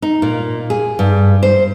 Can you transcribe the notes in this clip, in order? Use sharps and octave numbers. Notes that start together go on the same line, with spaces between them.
D#4
A#2
G#4
G2
C5